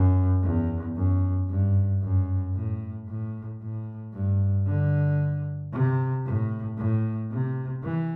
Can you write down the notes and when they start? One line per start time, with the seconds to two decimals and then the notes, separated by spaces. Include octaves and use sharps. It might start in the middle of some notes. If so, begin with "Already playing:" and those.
Already playing: F#2
0.43 E2
0.96 F#2
1.50 G2
2.03 F#2
2.55 A2
3.08 A2
3.61 A2
4.14 G2
4.67 D3
5.73 C3
6.26 A2
6.78 A2
7.32 C3
7.84 E3